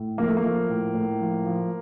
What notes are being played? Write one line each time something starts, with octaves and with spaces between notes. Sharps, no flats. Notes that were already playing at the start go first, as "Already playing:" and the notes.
Already playing: A2
F3 A#3
A3
A#3
F3
A2
A2
F3
F3